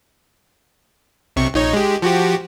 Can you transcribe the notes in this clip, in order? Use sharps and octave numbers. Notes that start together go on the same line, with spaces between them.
B1 C3 C#6
A#1 D#4 C#5
G#3 G4
F3 F#4 G4